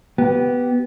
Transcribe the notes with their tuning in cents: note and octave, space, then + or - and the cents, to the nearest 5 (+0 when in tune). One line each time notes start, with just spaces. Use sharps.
B3 +0 G4 -20